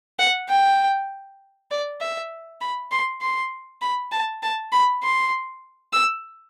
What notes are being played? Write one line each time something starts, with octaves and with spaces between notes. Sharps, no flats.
F#5
G5
D5
E5
B5
C6
C6
B5
A5
A5
B5
C6
E6